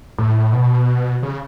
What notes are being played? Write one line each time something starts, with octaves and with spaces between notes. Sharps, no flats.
A2
B2
C#3